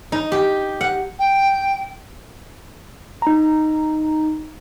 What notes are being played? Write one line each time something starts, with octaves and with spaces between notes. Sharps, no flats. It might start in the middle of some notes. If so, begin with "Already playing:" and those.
D#4
G4
F#5
G5
D#4 A#5